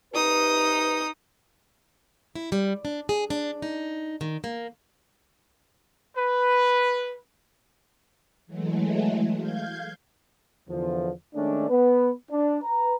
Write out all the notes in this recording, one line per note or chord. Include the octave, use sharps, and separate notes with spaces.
C3 D#4 G4 B4 D#6
E4
G3
D4
G#4
D4
D#4
D#3
A#3
B4
E3 F#3 G#3 A3
F5 G6 G#6
E2 D3 F3
D#3 G#3 A3 C#4 D4
B3 B4
D4
B4 A#5